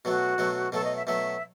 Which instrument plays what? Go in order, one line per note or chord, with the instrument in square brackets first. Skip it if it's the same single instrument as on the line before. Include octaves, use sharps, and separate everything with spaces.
[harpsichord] B2 F#3 A3 [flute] F#4
[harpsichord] B2 F#3 A3
[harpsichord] B2 F#3 A3 [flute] A4
[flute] D#5
E5
[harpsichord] B2 F#3 A3 [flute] E5